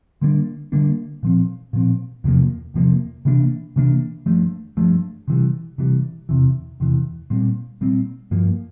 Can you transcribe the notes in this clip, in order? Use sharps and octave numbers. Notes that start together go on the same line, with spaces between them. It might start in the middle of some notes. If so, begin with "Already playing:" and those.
D3 G3 A#3 D4
D3 G3 A#3 D4
A#2 F3 C4
A#2 F3 C4
E2 C3 F3 A#3
E2 C3 F3 A#3
C3 E3 A#3 D4
C3 E3 A#3 D4
G2 F3 A3
G2 F3 A3
C3 E3 G3
C3 E3 G3
E2 C3 E3
E2 C3 E3
A#2 G3 C4
A#2 G3 C4
G2 F3 A#3